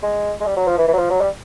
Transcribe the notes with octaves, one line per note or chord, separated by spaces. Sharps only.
G#3
G#3
G3
F#3
F3
E3
E3
F#3
F3
F#3
G3